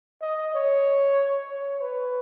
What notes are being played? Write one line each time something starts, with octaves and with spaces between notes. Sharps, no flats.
D#5
C#5
C#5
B4